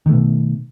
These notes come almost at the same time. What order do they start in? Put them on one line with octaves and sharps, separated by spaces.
D#3 A3 B2